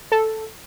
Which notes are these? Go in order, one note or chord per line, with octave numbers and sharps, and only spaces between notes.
A4